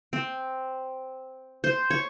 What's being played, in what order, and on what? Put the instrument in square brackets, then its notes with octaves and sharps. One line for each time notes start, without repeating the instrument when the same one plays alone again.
[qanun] C4
C5
C#5